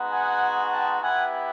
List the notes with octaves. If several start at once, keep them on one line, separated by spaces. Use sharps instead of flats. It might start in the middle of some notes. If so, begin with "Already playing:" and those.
Already playing: G#3 B3 D#4 F#4
F#5 G#5
G5 A5
B3 E4 G4 F#5 G#5